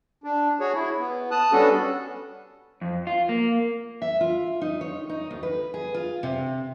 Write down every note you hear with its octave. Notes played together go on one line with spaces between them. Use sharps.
D4
F#4 G#4 C#5
E4
B3
A5 D#6 F#6
G3 B3 C#4 D4 F#4 A4
F2
F4
A#3
E5
F4
D#4
C#5
D#4
D2
B4
G#4
F4
C3